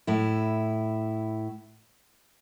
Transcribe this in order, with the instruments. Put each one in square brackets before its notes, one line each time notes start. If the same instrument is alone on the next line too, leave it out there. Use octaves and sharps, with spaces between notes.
[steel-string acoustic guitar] A2 E4